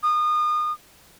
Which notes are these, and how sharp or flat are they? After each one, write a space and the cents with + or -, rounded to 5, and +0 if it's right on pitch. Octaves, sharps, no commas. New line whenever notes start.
D#6 -30